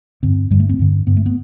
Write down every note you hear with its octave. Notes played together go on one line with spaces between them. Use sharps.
G2 D3 C4
G2 D3 G3
A3
C4
G2 D3
G2 D3 B3
A3
B3